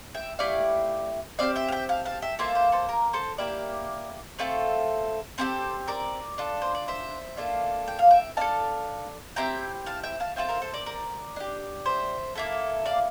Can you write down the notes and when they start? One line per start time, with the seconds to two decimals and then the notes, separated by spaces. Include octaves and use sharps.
0.15 E5 G5
0.39 A3 E4 G4 D5 F5
1.39 C4 G4 D5 F5
1.56 E5 G5
1.68 F5
1.72 E5 G5
1.89 F5 A5
2.05 F5 A5
2.22 E5 G5
2.39 A#3 F4 A4 C5 E5
2.55 C5 E5
2.72 A4 C5
2.89 A#4
3.13 A4 C5
3.38 A#3 E4 G4 A#4 D5
4.39 A3 C4 F4 A4
5.38 C4 E4 G4 A4 C5
5.88 A#4 D5
6.38 D4 F4 A4
6.62 C5
6.75 D5
6.88 C5 E5
7.37 A#3 D4 F4 A4
7.88 G5
7.99 F5
8.11 E5 G5
8.37 D4 A4 F5 A5
9.36 C4 E4 G4 G5 A#5
9.86 F5 A5
10.03 E5 G5
10.20 F5 A5
10.36 C4 F4 A4 E5 G5
10.49 A#4
10.62 A4 C5
10.73 A#4 D5
10.86 A#4 D5
11.36 D4 G4
11.86 C5 E5
12.35 A#3 E4 A4
12.86 D5 F5